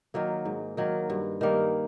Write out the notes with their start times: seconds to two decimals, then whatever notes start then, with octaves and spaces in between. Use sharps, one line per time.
0.14 D#3 F#3 A#3
0.45 G#2
0.77 D#3 F#3 A#3
1.10 G2
1.41 D#3 G3 A#3